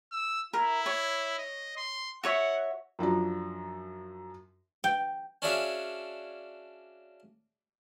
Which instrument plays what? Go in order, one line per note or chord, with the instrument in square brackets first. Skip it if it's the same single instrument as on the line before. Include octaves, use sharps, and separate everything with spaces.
[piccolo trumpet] E6
[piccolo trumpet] E4 [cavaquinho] A#4
[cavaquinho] C#5
[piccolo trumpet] D#5
C6
[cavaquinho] F#4 C#5 E5 [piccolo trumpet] F#5
[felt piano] F#2 F3 D4 A#5
[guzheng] G5
[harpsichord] C#4 D4 F#4 G#4 E5 F5